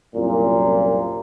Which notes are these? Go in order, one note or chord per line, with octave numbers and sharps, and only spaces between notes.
C2 F#2 A#2